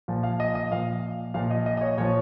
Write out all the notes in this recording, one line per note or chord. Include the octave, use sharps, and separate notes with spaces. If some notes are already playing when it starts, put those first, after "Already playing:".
A#2 F3
F5
D#5
D#5
A#2 F3 F5
A#2 F3 F5
D#5
D#5
D#5
C#5
A#2 F3 C#5